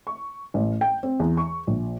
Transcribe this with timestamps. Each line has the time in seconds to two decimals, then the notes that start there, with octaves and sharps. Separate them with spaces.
0.07 C#6
0.54 A1
0.81 G5
1.03 C4
1.20 E2
1.37 C#6
1.67 A#1